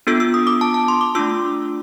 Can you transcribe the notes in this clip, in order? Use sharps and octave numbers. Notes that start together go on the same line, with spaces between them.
B3 D4 F4 A4 E6
E6
D#6
D6
A5
A5
C6
D6
A3 D4 F4 E6